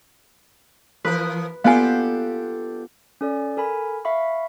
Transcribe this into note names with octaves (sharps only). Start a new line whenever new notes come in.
E3 F3 A#4 B4
B3 D4 F4 G4 A4 F5 G#5
C#4 A4 D5
A4 A#4 G#5 B5
E5 F5 B5 C#6